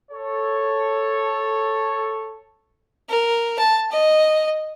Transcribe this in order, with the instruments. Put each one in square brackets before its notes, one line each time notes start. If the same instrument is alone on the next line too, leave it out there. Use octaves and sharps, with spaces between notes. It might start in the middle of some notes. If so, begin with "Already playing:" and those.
[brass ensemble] A4 C#5
[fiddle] A#4
A5
D#5